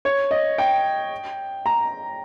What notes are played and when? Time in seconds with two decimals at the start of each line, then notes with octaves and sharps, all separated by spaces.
0.05 C#5
0.31 D#5
0.58 G5
1.66 A#5